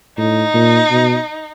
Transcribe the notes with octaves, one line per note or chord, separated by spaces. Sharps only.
A2 D#4
A#2
B2